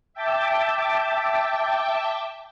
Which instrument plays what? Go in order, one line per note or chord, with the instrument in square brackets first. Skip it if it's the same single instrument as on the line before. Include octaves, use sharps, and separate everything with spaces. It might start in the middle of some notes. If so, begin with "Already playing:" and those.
[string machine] E5 G5 A5 D6